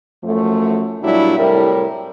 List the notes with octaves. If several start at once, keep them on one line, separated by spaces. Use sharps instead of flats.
F#2 F3 A3
A#2 F#3 G3 D4 E4
A2 C3 G3 A#4